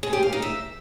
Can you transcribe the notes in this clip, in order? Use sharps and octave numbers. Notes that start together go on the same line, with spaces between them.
G#4
G4
F5
D#4
E5